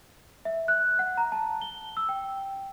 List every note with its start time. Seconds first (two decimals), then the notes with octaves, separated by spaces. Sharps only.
0.45 E5
0.68 F#6
0.99 F#5
1.17 A#5
1.32 A5
1.62 G7
1.97 E6
2.09 G5